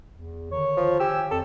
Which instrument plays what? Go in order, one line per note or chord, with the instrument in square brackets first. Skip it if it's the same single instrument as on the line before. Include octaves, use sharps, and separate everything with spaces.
[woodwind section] E2
D3 D#3 C#5
[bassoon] F3
[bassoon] G4 [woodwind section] G#5 E6
[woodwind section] F2 [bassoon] A4